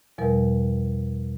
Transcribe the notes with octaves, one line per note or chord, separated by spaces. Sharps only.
E2 B2 F3 G3 A#4